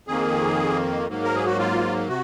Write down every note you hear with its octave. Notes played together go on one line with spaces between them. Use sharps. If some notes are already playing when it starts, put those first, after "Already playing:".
F2 D#3 A#3 G#4
G#2 F#3 A#3
A#4
G#4
F#4
F4
C3 F#4